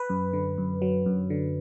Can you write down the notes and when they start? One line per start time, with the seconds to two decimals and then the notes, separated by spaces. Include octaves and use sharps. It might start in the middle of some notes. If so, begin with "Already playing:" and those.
Already playing: B4
0.10 F#2
0.33 D3
0.58 F#2
0.82 F#3
1.06 F#2
1.30 D3